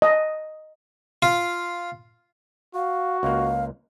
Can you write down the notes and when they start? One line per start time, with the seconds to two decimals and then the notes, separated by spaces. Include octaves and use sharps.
0.02 D#5
1.22 F4
2.75 F#4 F5
3.23 C#2 A#3 F5